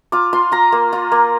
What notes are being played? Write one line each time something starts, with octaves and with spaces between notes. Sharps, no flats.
F4 D6
F4 C6
F4 A#5
A#3
F4
A#3